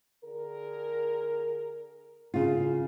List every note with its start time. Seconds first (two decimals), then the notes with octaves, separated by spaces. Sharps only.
0.24 D3 G#4 A#4
2.34 C#3 F4